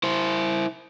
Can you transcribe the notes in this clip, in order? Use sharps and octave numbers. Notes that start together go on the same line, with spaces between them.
E4 C5